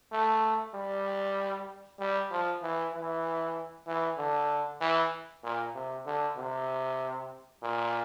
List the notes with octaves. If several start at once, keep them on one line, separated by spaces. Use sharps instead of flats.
A3
G3
G3
F3
E3
E3
E3
D3
E3
A#2
C3
D3
C3
A#2